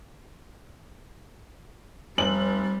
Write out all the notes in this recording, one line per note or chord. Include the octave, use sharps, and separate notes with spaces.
F1 G3 F#7